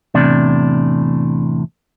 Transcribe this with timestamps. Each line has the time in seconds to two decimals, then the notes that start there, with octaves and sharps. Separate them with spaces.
0.14 E2 A2 C3 D4